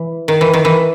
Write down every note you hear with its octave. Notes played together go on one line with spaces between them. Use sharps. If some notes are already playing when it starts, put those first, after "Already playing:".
Already playing: E3
D#3
E3
D#3
E3